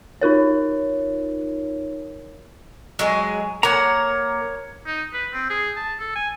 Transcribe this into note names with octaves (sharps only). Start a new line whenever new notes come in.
D#4 F4 A#4 C#5
F#3 G#3 G#4
A#3 C#5 F#5 A#5
D#4
B4
C4
G#4
A5
A4
G#5